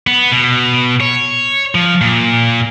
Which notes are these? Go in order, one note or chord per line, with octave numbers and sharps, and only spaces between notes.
B3
B2
C#5
F3
A#2